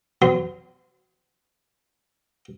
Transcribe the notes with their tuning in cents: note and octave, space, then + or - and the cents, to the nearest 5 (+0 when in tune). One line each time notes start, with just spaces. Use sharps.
F#3 +0 B3 +45 C6 -25